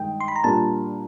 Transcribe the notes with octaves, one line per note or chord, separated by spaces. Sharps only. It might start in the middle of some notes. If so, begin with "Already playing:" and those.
Already playing: G2 D#3 G#3 G5
C6
B5
A#5
A#2 G3 A#3 D4 A5